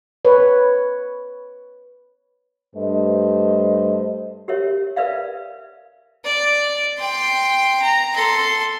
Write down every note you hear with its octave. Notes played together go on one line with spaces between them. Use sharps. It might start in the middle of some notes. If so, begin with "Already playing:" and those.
B4 C#5
G2 A3 C5 D#5
G4 A#4 C#5 E5
A#4 B4 D5 E5 F5
D5
G5 C6
A#5
A4 C6